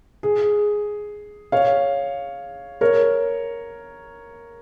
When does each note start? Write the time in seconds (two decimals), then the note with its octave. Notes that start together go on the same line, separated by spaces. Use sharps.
0.23 G#4
1.52 C#5 F5
2.81 A#4 C#5